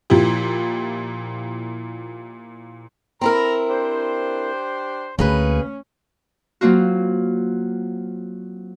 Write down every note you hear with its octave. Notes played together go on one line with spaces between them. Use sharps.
A#2 F3 E4 G4
C4 E4 A#4 A#5
D4 G4 C5
D2 A#3 C#4 G#4 B4
F#3 A#3 C4 F4 F#4